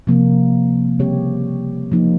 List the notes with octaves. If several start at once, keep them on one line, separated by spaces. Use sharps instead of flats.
C3 F3 A#3
C#3 G3 C4 G4 C#5
F3 A#3 D#4